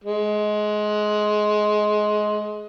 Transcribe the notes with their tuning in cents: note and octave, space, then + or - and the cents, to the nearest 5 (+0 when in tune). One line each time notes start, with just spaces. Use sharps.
G#3 +20